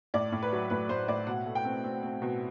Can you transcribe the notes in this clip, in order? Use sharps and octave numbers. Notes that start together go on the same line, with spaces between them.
A2 D5
A2
B4
F#3
A2 B4
A2 C5
A2 D5
B2 F#5
A3
G5
C4
C4
C4
B2